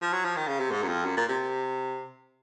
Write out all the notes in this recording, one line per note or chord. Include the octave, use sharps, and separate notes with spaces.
F3
F#3
F3
D#3
C#3
C3
G#2
F#2
F2
F#2
A#2
C3